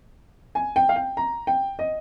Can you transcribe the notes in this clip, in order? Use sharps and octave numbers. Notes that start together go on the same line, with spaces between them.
G#5
G5
F5
G5
A#5
G5
D#5